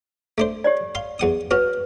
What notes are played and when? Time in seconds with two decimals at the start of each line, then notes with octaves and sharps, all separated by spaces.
0.38 A3 D4 C5
0.64 G4 C#5 D5
0.95 F5 C6
1.19 E2 F#5 D#6
1.51 C#4 F#4 B4